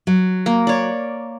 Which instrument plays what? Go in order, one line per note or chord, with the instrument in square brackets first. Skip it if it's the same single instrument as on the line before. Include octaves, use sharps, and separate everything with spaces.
[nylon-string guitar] F#3
[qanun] A#3
C#5 D5